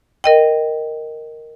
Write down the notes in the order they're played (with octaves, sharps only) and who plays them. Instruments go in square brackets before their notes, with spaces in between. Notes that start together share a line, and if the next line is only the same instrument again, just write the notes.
[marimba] A#4 D#5 G5